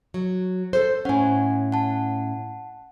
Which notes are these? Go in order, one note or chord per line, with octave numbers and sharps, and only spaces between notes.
F#3
A4 C5
A2 C#4 F#5 G#5
F#5 A5